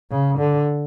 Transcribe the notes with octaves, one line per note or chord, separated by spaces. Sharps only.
C#3
D3